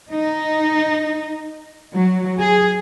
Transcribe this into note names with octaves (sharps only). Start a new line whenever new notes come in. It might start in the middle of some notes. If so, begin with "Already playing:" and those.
D#4
F#3
G#4